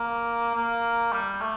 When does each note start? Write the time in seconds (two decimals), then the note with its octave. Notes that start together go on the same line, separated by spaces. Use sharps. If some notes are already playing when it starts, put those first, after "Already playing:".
Already playing: A#3
0.55 A#3
1.13 G3
1.41 A3